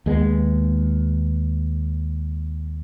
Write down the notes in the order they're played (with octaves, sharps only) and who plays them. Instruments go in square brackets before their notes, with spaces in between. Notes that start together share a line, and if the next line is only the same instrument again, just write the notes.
[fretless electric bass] D#2 G#3 B3